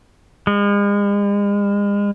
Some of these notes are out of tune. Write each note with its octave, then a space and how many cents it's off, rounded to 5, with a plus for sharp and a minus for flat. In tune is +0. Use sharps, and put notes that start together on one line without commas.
G#3 -40